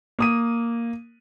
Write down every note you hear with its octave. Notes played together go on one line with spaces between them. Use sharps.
A#3 D#6 D#7